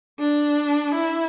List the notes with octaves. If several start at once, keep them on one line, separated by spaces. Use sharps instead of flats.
D4
E4